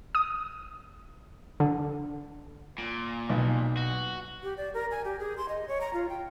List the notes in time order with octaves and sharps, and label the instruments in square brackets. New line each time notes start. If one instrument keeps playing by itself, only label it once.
[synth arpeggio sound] D#6
D3
[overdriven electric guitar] A#2
[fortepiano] B1
[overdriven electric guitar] F#4
[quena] G4
D5
A#4
G#5
G4
G#4
C6
D#5
C#5
A#5
F4
G5